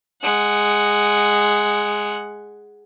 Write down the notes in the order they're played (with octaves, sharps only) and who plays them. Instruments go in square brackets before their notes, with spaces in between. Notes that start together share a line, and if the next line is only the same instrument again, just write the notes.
[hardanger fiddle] G#3 F#5